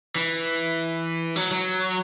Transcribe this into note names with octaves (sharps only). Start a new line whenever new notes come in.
E3
F#3
F#3